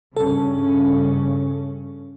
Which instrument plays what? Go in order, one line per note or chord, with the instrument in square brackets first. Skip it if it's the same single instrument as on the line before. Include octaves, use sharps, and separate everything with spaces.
[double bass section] G2 C#3 C#4 [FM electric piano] A4